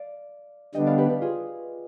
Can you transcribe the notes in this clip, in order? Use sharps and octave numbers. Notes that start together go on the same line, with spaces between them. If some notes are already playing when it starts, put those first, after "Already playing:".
Already playing: D5 F5
D3 G3 B3 D4 D#5 G5
D5 F5
G4 B4
G4 B4
F4 G#4